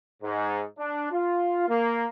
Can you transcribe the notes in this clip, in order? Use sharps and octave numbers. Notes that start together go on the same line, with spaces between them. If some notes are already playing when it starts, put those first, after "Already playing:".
G#2
D4
F4
A#3